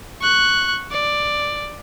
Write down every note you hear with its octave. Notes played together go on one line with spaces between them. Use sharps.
C#6 F#6
D5